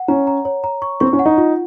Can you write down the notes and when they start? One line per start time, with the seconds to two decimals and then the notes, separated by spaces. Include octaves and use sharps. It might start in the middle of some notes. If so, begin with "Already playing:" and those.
Already playing: F#5
0.08 C#4 A#5
0.27 A#5
0.45 C#5
0.64 A#5
0.82 C#6
1.00 C4 C#6
1.13 C#4
1.19 F#5
1.25 D#4
1.38 F4